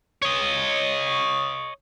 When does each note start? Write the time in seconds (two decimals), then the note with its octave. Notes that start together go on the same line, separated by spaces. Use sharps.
0.22 C#5 D#5